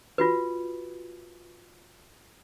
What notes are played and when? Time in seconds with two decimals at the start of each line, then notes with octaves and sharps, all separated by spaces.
0.18 F4 F#4 B4